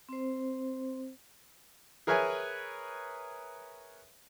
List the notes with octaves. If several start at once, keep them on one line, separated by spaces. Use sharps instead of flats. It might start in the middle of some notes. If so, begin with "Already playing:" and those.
C4 C5
G#4 A#4 B4 C#5 E5 G#5